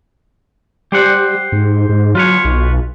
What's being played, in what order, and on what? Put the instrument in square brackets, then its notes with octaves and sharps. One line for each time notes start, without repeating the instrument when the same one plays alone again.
[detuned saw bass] G3 [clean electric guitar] G4 C5 F#5
[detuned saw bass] G#2
G#2
[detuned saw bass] F#3 [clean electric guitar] F4 B4 C#5
[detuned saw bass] B1